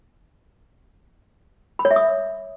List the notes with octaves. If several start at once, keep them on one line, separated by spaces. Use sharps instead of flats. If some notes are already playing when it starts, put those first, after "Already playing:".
B5
C#5
E5
D#6